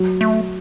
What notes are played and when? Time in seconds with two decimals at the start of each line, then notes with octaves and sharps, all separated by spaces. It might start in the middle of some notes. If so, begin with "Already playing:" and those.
Already playing: F#3 F#4
0.21 A3